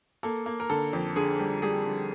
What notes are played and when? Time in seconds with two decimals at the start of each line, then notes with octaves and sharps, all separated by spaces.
0.23 A#3 A4
0.46 A#3
0.60 A#4
0.70 D3 A4
0.93 F2
1.16 D3 G#4
1.39 G3
1.62 G3 G#4
1.86 D3